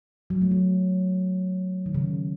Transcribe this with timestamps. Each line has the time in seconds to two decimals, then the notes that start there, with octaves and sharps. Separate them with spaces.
0.30 F#3
0.41 A3
0.51 F#3
1.86 D#3
1.94 C#3